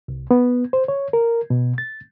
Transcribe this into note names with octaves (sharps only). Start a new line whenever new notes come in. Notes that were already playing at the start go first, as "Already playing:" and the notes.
C2
B3
C5
C#5
A#4
B2
A6